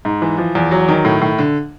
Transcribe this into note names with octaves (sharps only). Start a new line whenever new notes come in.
G#2
E3
F3
E2
F#3
D#3
A2
A2
D3